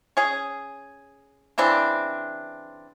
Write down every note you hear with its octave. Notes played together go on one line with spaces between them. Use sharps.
C#4 G#4
C#3 E3 C4 D4